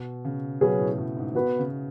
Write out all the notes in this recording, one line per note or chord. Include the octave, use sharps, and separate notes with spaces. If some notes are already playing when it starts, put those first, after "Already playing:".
Already playing: B2
C#3
B2 F#3 C#4 G#4 B4
A2
A2
G#2
B2 B3 F#4 B4
C#3